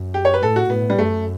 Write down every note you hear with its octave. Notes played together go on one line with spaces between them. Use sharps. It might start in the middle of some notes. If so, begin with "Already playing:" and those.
Already playing: F#2
G4
C#5
B4
A2 A4
F#4
A2 B3
G3
F#2 A3